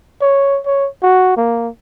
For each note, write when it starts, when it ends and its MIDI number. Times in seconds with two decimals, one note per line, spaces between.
0.22 0.60 73
0.66 0.88 73
1.03 1.34 66
1.37 1.69 58